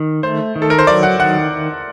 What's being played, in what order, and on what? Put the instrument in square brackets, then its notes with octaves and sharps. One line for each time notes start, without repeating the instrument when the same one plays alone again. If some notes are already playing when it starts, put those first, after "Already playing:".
Already playing: [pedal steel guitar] D#3
[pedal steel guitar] A3 [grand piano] C5
[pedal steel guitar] D#3
[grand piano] A4
A#4
C5
[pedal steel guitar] F#3 [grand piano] D5
[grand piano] F#5
[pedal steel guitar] D#3 [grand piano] F#5